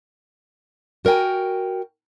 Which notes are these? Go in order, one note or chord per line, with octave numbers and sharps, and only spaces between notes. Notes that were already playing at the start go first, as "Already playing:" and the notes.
F#4 A#4 C#5 G5 G#5